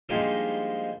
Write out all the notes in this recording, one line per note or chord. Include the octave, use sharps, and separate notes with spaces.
F3 G3 G#3 A#3 D4 D#4